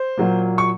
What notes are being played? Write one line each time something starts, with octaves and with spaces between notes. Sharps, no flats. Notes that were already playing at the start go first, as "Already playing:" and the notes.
Already playing: C5
A#2 F#3 A#3
C#6